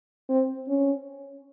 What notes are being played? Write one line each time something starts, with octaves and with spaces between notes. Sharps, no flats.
C4
C#4